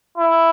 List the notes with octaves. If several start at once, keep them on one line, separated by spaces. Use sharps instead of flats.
E4